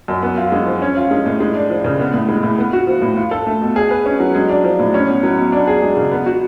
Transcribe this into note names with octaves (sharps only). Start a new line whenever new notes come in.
F#2
B3
F4
G#3
F3
C#4
F4
G#3
A2
G#3
D4
F3
C#3
B3
A2
G#3
A2
B3
F#4
F3
A2
F4
A4
A3
B2
G#4
B4
C#4
F#3
G#3
D4
F3
A2
C#4
B2
F#3
B2
D4
G#4
G#3
C#3
B3
F#4